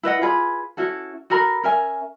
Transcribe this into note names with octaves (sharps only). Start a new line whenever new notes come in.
E4 B4 D#5 F#5
F4 G#4 B4
C#4 E4 F#4 A4
F#4 A4 A#4 B5
C#4 A#4 E5 G#5